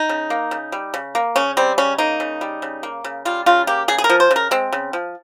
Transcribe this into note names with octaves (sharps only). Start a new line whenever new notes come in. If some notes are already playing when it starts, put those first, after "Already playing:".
Already playing: D#4
C#3
A#3
C#3
G3
C#3
A#3
C#3 C#4
G3 C4
C#3 C#4
A#3 D#4
C#3
G3
C#3
A#3
C#3
G3 F4
C#3 F4
A#3 G4
C#3 G#4
G#4
A#4
F3
C5
C#3
A#4
G#3 C4
C#3
F3